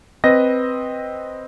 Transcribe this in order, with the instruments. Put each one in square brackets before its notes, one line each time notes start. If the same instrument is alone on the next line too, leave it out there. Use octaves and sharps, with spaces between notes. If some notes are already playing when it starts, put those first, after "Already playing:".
[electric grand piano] C4 B4 D#5 A#6